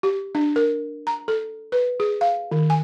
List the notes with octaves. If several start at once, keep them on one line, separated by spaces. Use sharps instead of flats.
G4
D4
A#4
A#5
A4
B4
G#4
F5
D#3
G#5